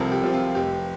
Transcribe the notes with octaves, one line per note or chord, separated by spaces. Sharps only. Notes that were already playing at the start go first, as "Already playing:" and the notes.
Already playing: C2 C3 F3 C4 A4 A#4
G4
C3 F3 C4
F4
F1 G4